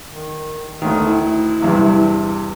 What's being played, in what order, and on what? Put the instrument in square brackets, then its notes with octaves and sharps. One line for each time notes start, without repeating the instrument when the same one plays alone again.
[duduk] D#3
[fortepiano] D2 D#3 [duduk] A3
[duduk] E4
[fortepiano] E2 G2 C3